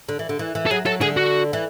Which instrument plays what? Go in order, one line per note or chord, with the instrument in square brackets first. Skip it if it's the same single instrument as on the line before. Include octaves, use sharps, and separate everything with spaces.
[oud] D3
E3
D3
E3
E3
[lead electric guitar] A4
[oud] F#3 [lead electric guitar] G#4
[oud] F#3 [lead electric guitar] A4
[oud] D3 [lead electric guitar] G#4
[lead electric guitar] F#4
[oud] E3